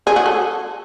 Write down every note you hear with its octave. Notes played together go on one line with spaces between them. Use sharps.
G#4
F#4
A4